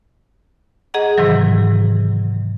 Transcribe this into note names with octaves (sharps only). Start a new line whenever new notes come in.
G#4 D#5 F#5 A#5
G#2 C3 D#3 E3 F#3